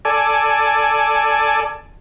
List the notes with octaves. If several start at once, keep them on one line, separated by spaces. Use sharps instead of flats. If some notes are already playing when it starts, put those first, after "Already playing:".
A4 D5 G#5